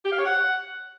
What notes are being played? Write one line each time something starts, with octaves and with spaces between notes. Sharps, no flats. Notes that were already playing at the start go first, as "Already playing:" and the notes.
G4
F5
C#5
F#5